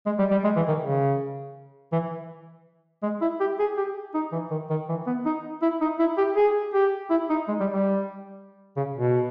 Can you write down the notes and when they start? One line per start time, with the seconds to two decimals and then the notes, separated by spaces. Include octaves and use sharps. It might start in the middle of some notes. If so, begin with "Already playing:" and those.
0.06 G#3
0.19 G3
0.31 G3
0.44 G#3
0.56 E3
0.68 D#3
0.81 C#3
1.92 E3
3.03 G#3
3.21 E4
3.40 G4
3.59 G#4
3.77 G4
4.14 D#4
4.32 E3
4.51 D#3
4.70 D#3
4.89 E3
5.07 B3
5.26 D#4
5.62 E4
5.81 D#4
5.99 E4
6.18 G4
6.36 G#4
6.74 G4
7.10 E4
7.30 D#4
7.48 G#3
7.60 G3
7.72 G3
8.77 C#3
8.96 B2